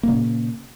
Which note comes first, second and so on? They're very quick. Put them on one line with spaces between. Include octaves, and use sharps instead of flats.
A#3 C#3 A#2